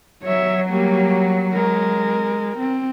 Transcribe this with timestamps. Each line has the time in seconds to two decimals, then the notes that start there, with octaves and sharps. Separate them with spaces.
0.24 F#3 C#5 E5
0.69 G3 A#3
1.53 G#3 A#4
2.58 C4